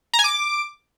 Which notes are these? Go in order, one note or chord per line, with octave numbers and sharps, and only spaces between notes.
A#5
G#5
D6